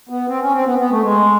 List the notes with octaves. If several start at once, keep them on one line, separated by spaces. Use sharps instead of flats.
B3
C4
C#4
C4
B3
B3
A3
G#3